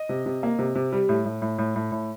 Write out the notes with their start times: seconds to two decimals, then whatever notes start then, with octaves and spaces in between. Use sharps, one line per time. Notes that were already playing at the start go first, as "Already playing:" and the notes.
Already playing: D#5
0.09 C3
0.26 C3
0.43 A#3
0.59 C3
0.75 C3
0.92 G3
1.09 A2
1.25 A2
1.42 A2
1.58 A2
1.76 A2
1.92 A2